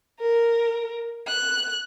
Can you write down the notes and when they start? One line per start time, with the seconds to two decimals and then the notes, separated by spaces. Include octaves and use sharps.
0.20 A#4
1.27 F#6